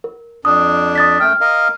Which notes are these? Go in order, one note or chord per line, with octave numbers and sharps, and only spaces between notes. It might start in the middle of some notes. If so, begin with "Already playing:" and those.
A#4
F2 D4 D#6
D#6 A6 B6
F#2 A3 G5 F6
A#4 D#5 F5